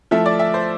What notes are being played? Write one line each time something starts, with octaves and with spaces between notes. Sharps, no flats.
F3 A3 E4 E5
D5
E5
C5